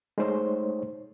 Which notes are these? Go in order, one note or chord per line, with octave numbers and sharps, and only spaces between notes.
G#3 A3 D#4 C5 C#5